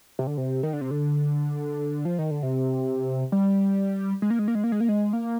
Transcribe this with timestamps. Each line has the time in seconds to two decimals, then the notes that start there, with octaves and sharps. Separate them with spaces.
0.19 C3
0.27 D3
0.38 C3
0.63 D#3
0.73 D3
0.81 C3
0.91 D3
2.05 F3
2.18 D#3
2.31 D3
2.43 C3
3.32 G3
4.22 G#3
4.30 A#3
4.39 G#3
4.48 A#3
4.55 G#3
4.64 A#3
4.72 G#3
4.80 A#3
4.89 G#3
5.13 A#3